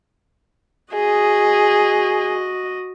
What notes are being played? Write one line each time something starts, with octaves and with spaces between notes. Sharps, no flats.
F#4 G#4 D#5